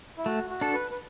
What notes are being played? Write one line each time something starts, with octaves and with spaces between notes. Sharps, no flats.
E4
A3 F#4
F#4
D4 A4
B4
B4